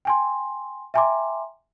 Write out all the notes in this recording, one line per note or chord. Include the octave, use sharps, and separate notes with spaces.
G5 G#5 C6
E5 G5 G#5 A#5 C6 D6